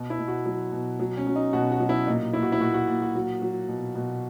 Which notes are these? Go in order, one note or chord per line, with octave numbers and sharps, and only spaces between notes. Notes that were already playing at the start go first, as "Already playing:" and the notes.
Already playing: B2
E4
B2
F#4
F#3
B2
F#3
C#4
F#3
D#4
B2 F#4
F#4
F#3
E4
A#2 D#4
A#2 E4
F#4
E4
A#2 F#4
F#4
A#2
F#4
F#3
F#3
B2
B2